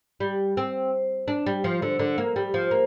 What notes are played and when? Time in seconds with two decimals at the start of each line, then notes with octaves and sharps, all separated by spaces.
0.20 G3
0.57 C4
1.28 D4
1.46 G3
1.64 F3
1.82 D3
1.99 D3
2.18 A#3
2.36 G3
2.54 F3
2.71 A#3